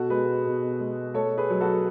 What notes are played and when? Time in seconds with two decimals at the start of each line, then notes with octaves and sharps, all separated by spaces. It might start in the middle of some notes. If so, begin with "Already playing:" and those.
Already playing: B2 F#4 A4
0.10 G#3 G#4 B4
0.45 B2
0.80 G#3
1.14 A3 A4 C#5
1.38 G#4 B4
1.50 F#3
1.61 F#4 A4